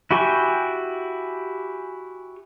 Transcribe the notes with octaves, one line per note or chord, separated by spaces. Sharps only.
E4 F#4 G4 G#5 C#6